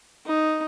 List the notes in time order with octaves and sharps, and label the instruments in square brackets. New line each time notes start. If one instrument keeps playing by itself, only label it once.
[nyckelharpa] D#4